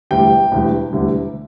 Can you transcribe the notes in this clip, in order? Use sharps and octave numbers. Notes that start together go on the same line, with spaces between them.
E1 D2 D3 G3 G5
E1 D2 D3 G3
E1 D2 D3 G3